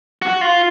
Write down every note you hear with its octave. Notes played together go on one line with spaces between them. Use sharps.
F#4
F4